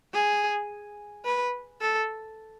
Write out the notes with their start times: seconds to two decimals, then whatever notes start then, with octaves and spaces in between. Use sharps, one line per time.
0.14 G#4
1.25 B4
1.81 A4